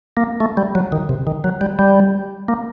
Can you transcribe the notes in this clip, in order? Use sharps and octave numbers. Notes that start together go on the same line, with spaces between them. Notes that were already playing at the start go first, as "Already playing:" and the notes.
A#3
A3
G3
F#3
D#3
C3
D#3
F#3
G3
G3
A#3